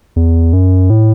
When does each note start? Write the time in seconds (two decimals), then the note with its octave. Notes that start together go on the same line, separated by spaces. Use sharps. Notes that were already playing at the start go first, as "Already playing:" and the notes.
0.16 E2
0.53 F#2
0.90 A2